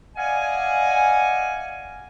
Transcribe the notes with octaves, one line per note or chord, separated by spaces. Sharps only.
D5 D#5 F5 F#5 G#5